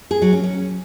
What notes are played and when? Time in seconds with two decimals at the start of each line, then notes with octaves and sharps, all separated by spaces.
0.11 G#4
0.22 F#3
0.33 C#4
0.44 C#4